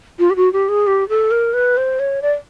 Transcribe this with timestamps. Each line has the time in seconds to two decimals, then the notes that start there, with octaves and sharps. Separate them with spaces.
0.19 F4
0.30 G4
0.36 F#4
0.53 G4
0.69 G#4
0.87 G4
1.09 A4
1.31 A#4
1.54 B4
1.77 C5
2.00 C#5
2.22 D5